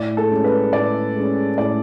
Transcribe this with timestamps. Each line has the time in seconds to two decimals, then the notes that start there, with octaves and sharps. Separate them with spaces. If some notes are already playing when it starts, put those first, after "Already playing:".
Already playing: A2 D5
0.17 A4
0.30 G#3 C#4
0.44 B4
0.73 A2 D5
1.15 G#3 C#4
1.58 A2 D5